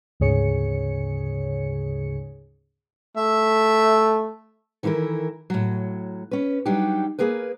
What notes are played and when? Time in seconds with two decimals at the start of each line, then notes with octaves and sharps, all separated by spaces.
0.20 D2 G#2 C#3 G#4 C#5 C#7
3.17 A3 E5
4.83 D#3 E3 E4 A4 A#4
5.50 A2 F#3
6.31 C#4 B4
6.66 F#3 G3 D4 D#4 G4
7.19 A#3 G#4 A#4 B4